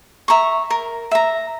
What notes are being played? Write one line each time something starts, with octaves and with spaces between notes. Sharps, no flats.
E5 A#5 C#6
A#4
E5 A#5